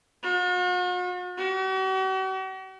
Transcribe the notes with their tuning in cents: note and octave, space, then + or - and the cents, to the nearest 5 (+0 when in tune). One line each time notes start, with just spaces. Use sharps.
F#4 -45
F#4 +45